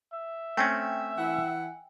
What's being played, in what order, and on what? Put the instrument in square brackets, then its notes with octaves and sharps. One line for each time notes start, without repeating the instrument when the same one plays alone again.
[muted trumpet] E5
[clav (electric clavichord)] A3 C4 C#4 [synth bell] G5 G#5
[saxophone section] E3 E4 F#5